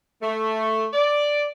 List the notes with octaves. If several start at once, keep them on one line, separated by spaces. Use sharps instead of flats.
A3
D5